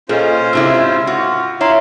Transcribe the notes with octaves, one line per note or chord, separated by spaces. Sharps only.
A#2 C#4 F4 G#4 A4 C5 D#5
G#2 C3 E4 E6
F4 F#4
E4 C#5 F5 A#5 C6